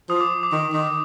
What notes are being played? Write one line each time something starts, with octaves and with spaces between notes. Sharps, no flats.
F3 D#6
D6
D6
D#3
D#3